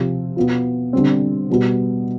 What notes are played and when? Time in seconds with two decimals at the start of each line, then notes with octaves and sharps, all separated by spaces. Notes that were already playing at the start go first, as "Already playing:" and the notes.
Already playing: C3 F3 C4 F4
0.36 B2 B3 F4
0.93 D3 G3 C4
1.50 B2 G3 B3